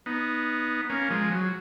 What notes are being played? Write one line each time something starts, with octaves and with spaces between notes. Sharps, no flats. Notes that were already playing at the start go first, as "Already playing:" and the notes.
B3 D#4
A#3 C#4
F3 G#3
F#3